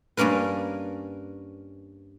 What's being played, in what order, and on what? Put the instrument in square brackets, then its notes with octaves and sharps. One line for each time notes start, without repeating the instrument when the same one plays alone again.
[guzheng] G2 A#3 C#4 A#4 B4